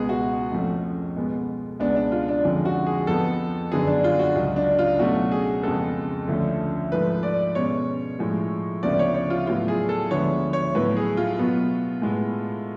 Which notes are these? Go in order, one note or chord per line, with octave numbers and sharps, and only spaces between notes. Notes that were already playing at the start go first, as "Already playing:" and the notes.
Already playing: C#2 B2 G#3 B3 G#4
F#4
F2 F3 A3 C#4
B2 G#3 B3
C#2 B2 G#3 B3 D4
D4
F4
D4
F2 D3 F3 G#3 C#4
F#4
G#4
F2 F3 B3 A4
F#2 D3 F#3 B3 G#4
D4
F4
F#4
C#2 C#3 F#3
D4
F4
B2 F#3 A3 C#4 F#4
G#4
F2 C#3 G#3 B3 A4
D2 D3 F3 A3 C#4
G#2 F3 A3 B4
D5
B2 G#3 C#4 C#5
A2 F3 G#3
D2 C#3 F3 B3 D5
C#5
C#5
F4
A2 F#3 B3 F4
G#4
A4
D2 D3 F3 G#3 B3 C#5
C#5
A2 F#3 B3 B4
G#4
F4
B2 F#3 B3
A2 G#3 B3